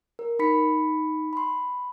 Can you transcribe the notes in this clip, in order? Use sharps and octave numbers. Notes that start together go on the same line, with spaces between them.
A#4
D#4 B5 B6 C#7
B5 C6